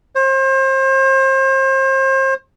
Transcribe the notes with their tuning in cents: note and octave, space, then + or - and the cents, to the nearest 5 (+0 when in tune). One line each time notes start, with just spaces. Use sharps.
C5 +35